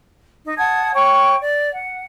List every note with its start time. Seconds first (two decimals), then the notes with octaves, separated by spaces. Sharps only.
0.45 D#4
0.58 F#5 A5 D#6 G#6
0.93 C#5 G5 C#6
1.41 D5
1.72 F#5